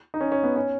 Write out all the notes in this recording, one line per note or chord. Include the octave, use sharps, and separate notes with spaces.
D#4
C#4
C#4
B3
C#4